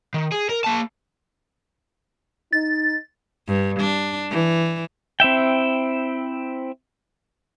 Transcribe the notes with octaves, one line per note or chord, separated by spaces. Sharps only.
D#3
G#4
A#4
A#3 A5
D#4 A6
G2
D4
E3
C4 E4 E5 G5